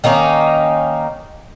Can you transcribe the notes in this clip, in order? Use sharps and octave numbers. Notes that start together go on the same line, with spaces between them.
D#3 A#3 C#4 D#4